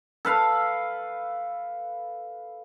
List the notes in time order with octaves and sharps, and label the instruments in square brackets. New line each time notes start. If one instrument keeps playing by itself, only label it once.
[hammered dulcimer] A4 B4 F5